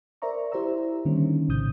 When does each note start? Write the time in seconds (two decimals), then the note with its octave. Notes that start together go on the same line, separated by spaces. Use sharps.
0.22 A#4 C5 D5 E5 A#5 C#6
0.52 E4 G4 C5 E5 A#5 E6
1.05 D3 D#3 G3 A#3 C#4
1.48 A#1 A2 C#3 D#6 G6